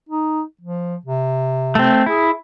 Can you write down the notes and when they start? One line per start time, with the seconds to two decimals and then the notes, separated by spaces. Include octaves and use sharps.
0.09 D#4
0.61 F3
1.06 C3
1.75 A3 C4
2.06 E4 G#4